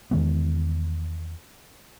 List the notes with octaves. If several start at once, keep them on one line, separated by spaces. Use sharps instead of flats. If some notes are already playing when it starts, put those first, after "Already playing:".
E2 D#3 G#3 B3